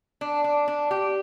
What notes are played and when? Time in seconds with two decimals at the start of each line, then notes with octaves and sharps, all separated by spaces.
0.21 D4
0.44 D4
0.68 D4
0.91 G4